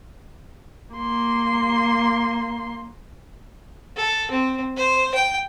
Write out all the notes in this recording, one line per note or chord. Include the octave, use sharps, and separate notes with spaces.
A#3 C6
A4
C4
C5
G5